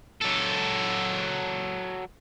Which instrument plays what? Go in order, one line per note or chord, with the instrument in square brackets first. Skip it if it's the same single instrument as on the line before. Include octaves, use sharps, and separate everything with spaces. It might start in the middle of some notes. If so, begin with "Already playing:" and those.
[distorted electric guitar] F#3 A4